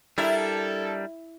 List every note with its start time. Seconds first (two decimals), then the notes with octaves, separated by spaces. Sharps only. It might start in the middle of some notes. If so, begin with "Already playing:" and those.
0.18 G3 D4 E4 A4 A#4